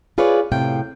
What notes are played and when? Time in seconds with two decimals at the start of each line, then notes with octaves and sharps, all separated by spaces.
0.18 F4 G#4 B4 C#5 D5
0.52 A2 C3 F5 G5